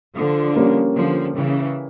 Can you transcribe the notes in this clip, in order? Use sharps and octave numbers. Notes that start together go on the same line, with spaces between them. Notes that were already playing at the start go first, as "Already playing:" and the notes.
D3 F3
G3 A#3 C#4
D3 F3
C#3 E3